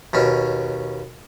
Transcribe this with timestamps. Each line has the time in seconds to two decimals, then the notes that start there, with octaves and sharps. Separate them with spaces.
0.13 D#2 B2 C#4